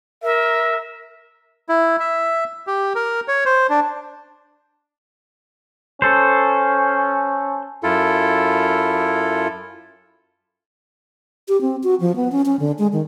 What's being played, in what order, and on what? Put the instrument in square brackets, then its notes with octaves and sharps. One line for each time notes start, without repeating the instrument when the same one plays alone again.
[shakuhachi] A#4 [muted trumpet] E5
[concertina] E4
E5
G4
A#4
C#5
C5
D4
[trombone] C#4 [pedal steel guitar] A4 C5
[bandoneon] F#2 E4 F4 A4
[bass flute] G4
C4
F#4
F3
B3
C#4
C#4
D3
G#3
D#3